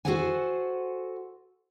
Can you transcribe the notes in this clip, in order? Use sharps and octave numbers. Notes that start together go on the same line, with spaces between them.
F#4 G#4 A4 C5 F#5 G#5